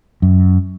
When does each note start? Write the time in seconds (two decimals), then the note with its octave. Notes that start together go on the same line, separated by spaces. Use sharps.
0.22 F#2